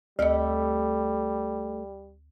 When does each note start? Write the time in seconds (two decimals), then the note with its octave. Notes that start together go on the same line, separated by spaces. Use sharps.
0.19 D2 G3 A3 G4 D#5